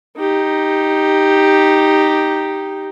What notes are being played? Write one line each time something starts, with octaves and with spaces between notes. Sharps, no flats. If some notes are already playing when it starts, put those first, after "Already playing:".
D#4 G4